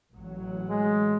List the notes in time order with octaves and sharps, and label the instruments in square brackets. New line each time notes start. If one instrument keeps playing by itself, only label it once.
[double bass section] A1 F#3
[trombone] G#3